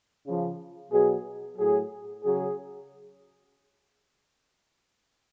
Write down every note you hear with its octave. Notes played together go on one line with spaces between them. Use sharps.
C#3 F3
B2 F#3 G#4
A2 F#3 G#4
C#3 F#3 G#4